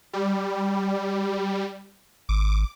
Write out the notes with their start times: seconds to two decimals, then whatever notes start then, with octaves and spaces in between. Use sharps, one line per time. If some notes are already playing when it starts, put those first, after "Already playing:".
0.13 G3
2.29 G#1 D6